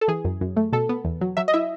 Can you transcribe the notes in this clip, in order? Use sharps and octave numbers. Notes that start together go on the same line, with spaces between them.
A4
E3 G#4
F#2
F#2
A3
B2 A4
B3
E2
F#3
F#3 E5
D#5
E4 E5